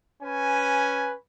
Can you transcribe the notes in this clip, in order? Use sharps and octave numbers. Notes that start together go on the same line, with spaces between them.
C#4 B4 G#5